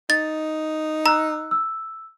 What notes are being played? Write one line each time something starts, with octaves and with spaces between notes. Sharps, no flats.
D#4 A6
A#5 E6 F#6
E6